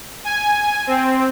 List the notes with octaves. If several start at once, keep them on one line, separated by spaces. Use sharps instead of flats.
G#5
C4